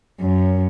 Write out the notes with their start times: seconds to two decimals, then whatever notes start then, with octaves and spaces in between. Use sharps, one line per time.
0.20 F#2